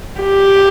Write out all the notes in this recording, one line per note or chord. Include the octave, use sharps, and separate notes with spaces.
G4